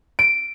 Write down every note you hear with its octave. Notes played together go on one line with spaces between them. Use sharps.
D7